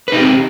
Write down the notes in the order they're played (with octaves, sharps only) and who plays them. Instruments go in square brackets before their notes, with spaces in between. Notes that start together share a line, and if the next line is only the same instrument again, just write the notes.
[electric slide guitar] B4
D#4
G4
C4